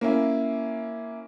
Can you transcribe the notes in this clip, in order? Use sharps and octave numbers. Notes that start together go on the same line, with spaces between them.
A#3 C#4 E4